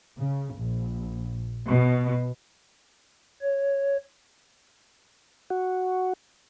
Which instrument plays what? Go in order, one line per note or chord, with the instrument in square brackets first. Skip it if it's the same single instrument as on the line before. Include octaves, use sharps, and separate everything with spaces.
[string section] C#3
A#1
B2
[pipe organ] C#5
[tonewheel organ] F#4